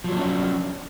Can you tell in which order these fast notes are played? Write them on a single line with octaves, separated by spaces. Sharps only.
F3 F#3 D4 C#4